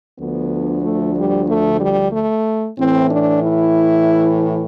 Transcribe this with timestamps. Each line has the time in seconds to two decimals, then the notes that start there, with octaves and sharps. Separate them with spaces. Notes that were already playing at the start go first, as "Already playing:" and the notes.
0.19 D2 D3 F3 B3
0.83 A3
1.16 G3
1.48 A3
1.81 G3
2.12 A3
2.78 A2 E3 C4
3.10 D4
3.42 E4